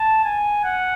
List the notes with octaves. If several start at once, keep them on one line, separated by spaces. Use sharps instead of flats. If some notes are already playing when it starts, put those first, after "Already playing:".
Already playing: A5
G#5
F#5